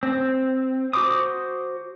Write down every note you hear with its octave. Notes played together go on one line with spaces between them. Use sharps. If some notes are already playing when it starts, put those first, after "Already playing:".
C4
F#4 C5 C6 D6 D#6